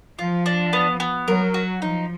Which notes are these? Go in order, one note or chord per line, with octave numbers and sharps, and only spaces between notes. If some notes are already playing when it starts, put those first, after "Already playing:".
F3 F4
D4
B3
B3
F#3 A#4
F#4
F3 D#4